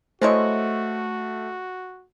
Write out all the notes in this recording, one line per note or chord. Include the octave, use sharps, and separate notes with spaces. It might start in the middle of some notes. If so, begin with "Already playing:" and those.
G#3 A3 E4 F#4 C5 C#5 D#5